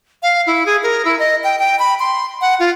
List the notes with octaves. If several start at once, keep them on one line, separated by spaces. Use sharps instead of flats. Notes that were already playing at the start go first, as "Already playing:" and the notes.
F5
E4
G#4
A#4
E4
D#5
G5
G5
B5
C6
F#5
F4